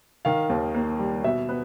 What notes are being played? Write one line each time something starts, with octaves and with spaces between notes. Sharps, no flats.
D#3 F5
D#2
A#3
G3
B2 E5
B3